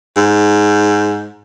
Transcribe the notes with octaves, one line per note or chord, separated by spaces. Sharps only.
G#2